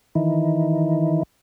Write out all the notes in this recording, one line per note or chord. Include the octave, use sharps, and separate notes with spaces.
D#3 E3